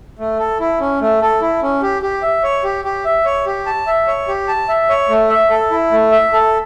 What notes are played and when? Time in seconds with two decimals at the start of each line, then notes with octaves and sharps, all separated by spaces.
0.19 A3
0.39 A4
0.60 E4
0.80 C#4
1.01 A3
1.21 A4
1.41 E4
1.62 C#4
1.82 G4
2.02 G4
2.23 E5
2.44 C#5
2.64 G4
2.85 G4
3.05 E5
3.25 C#5
3.46 G4
3.66 A5
3.87 E5
4.07 C#5
4.28 G4
4.48 A5
4.69 E5
4.89 C#5
5.09 A3
5.30 E5
5.51 A4
5.71 E4
5.91 A3
6.12 E5
6.33 A4